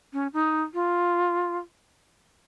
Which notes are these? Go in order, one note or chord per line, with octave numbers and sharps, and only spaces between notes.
C#4
D#4
F4